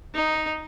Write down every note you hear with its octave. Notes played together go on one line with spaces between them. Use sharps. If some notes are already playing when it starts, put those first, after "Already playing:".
D#4